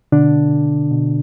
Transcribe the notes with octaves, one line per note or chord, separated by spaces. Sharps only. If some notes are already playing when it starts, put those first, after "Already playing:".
B2 D3 D4
B2